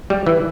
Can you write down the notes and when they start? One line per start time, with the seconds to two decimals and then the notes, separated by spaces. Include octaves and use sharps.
0.10 G3
0.26 E3